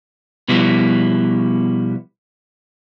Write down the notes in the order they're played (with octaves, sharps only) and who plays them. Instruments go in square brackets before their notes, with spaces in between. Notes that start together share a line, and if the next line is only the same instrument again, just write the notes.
[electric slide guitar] B2 F3 G3 B3 E4